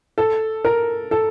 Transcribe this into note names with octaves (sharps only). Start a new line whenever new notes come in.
A4
A#4
A4